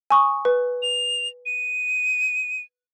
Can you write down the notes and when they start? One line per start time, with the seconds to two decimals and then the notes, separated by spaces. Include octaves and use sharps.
0.10 G#5 C#6 D#6
0.45 B4
0.82 F7
1.46 D#7